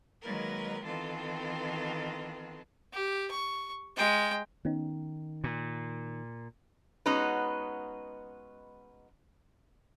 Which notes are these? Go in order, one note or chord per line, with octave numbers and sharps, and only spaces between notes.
D#3 F#3 G#3 A#3 A#4 B4
D#3 E3 B3 C4 F4 A4
G4
C#6
G#3 G5
D#3 B3 C#4 D#4
A#2
G#3 B3 C#4 D#4 F#4 B4